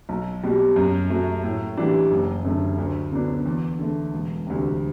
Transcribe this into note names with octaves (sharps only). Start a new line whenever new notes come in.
B1
B2 G3
F#2
F#3 A3
A2
E3 G3 D4
F#1
F#2 D3 A3
D2
D3 F#3 B3 D4
E2
D3 A3
E1
D2 C3